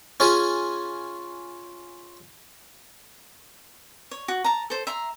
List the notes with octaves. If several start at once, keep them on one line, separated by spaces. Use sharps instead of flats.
C#4 F4 G#4
C#5
F#4
A5 A#5
A4 C5
E5 A#5 C6